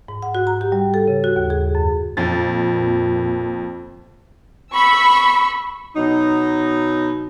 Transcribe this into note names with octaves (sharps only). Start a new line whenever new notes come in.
G#2
F#5
F#4
A#5
G4
G3
A4
C#3
F#4
D#2
G#4
F#2
F2 A#2 A6
B5 C#6 E6
B2 F#3 D#4